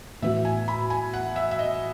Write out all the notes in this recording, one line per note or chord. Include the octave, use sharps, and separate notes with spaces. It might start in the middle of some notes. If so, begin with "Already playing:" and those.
A2 E3 B3 F#4 E5
G#5
B5
G#5
F#5
E5
E5
D#5